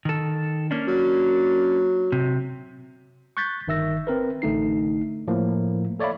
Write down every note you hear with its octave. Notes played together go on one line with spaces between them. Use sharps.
D#3 A4
A#3 C#4 D4
F#3
C3
C#6 F#6 G6 A6 B6
G1 D#3 E5 E6 A#6
C4 A#4 B4
A1 D3 A3 D#4 C7
A2 F3 A#3
A4 C#5 D5 E5 F5 B5